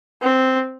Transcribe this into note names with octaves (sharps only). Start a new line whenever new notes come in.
C4